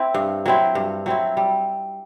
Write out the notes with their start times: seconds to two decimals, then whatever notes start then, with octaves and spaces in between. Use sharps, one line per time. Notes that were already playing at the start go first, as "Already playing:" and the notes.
Already playing: C4 E4
0.14 G2
0.46 F#3 C4 E4
0.75 G2
1.06 F#3 C4 E4
1.37 G3